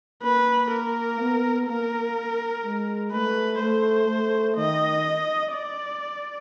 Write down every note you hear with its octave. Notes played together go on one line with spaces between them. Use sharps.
A#3 B4
A#4
B3
A#3 A#4
G#3
A3 B4
A3 C5
A3
D#3 D#5
D5